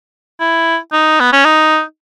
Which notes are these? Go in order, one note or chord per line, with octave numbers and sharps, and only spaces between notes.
E4
D#4
B3
C#4
D#4